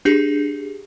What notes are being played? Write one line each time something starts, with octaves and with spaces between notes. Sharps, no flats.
D4 G4 G#4